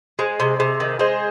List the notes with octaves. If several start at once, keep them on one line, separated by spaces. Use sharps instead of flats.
G#3 G#4 C5
C3
C3 G#4 C5
D#3
G#3 G#4 C5